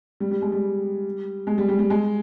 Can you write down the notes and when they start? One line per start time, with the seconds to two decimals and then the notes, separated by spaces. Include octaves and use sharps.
0.20 G3
0.31 G3
0.42 G#3
0.52 G3
1.47 G#3
1.58 G3
1.69 G3
1.79 G3
1.90 G#3